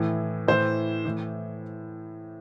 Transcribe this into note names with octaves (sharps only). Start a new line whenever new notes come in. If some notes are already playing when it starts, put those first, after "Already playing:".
Already playing: A2 E3
A2 E3 C5
A2 E3